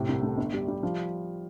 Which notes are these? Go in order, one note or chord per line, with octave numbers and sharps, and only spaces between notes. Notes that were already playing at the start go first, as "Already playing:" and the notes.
Already playing: A2 C3
C2
A3
G1
G3
G3
F3